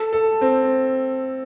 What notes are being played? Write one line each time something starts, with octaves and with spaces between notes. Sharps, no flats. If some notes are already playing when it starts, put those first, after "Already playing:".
Already playing: A4
A4
C4